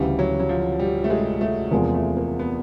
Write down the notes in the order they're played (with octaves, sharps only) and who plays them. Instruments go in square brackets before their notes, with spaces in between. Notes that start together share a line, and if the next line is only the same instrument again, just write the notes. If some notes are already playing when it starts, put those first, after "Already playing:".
Already playing: [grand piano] D2 C#3 E3 [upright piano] G3
[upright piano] F#3
F#3
F3
G3
A3
G#3
A3
[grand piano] E2 C3 F3 G#3 [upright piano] A#3
[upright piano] A3
A#3
B3